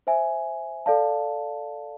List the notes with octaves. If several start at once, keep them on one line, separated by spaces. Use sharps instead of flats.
C5 E5 G#5
A4 D5 F5 A5